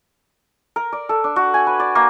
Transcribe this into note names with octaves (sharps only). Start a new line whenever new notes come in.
A#4
D5
A4
D4
F#4
G#5
B4
D5
A#3